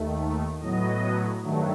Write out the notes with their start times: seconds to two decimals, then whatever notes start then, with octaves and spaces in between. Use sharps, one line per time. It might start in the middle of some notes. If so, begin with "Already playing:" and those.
Already playing: D#2 D#3 A3
0.59 A2 F#3 B3 D#5
1.43 G2 D#3 F#3 A3